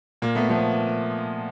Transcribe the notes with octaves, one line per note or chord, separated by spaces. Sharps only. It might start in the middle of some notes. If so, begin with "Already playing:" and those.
A#2 A#3
A3 B3
F3 A3 B3